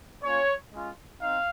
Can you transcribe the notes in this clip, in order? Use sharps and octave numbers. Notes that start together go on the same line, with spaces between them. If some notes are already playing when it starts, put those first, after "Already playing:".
A#3 C#4 F4 C#5
G#3 C#4 F4
C4 D#4 F5